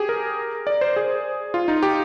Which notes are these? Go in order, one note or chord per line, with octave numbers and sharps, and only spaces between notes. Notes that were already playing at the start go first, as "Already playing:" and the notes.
Already playing: G4 G#4
A#4
D5
C5
G#4
F4
D#4
G4